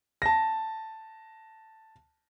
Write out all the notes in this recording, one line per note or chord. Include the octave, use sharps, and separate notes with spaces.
A5 A#6